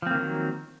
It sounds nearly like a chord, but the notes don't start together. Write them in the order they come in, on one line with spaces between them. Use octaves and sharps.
F3 C4 A#3 D#3 F#3